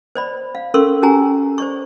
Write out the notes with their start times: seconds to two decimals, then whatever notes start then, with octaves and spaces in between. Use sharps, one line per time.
0.15 C5 D5 B5
0.55 F5
0.74 C#4 A4 A#4 C6 C#6 E6
1.02 C#4 F#4 G4 G#5 A#5
1.58 C5 D5 C#6